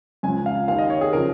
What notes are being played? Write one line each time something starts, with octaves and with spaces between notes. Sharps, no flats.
C#2 C#3 F3 G#5
F5
D#2 D#3 F5
D#5
C#5
G#4
C#3 F3 A#4